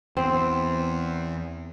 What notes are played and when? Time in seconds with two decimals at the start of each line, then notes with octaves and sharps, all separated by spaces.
0.17 E2 C4